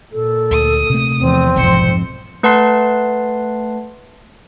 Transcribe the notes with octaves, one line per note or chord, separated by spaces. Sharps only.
A#2 A4
D2 D#6
C3 A3
E2 F3 C4
F1 B1 F2 G#2 C5 C#7
A3 B4 F#5 A5 C6 C7